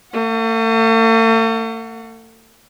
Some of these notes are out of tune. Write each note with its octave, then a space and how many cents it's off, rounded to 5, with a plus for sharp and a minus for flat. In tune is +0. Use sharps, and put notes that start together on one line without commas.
A3 +40 F#5 -15